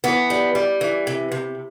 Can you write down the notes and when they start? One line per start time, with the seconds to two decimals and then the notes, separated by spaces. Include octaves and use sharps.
0.04 E3 B3
0.30 G3
0.55 G3
0.81 E3
1.07 C3
1.32 C3